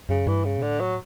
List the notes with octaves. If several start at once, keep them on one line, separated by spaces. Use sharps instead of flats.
F#2 C#3
G2 E3
C#3
B2
A2 D3
F#3